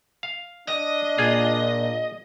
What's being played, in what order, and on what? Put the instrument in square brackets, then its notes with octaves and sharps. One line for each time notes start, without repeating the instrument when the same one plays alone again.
[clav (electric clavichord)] F5
[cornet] D4 [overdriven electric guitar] D#5
[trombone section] A#2 [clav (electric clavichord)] F4 G#4